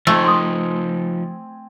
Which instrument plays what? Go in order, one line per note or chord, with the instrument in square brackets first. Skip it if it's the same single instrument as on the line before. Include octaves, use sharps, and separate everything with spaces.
[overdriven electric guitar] F3 D#4 [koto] A3 [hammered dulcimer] C4 G#5
[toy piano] C6 D#6